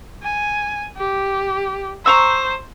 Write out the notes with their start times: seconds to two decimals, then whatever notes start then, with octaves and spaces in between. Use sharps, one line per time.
0.23 G#5
0.97 G4
2.06 C5 A#5 C#6 E6